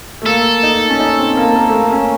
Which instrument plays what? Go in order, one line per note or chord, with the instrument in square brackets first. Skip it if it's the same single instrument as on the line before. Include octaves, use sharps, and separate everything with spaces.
[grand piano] A3
[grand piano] A#3 [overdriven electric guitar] A4
[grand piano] D#4
C#4
D#4
C4
A#3
A#3
A3
A#3
C#4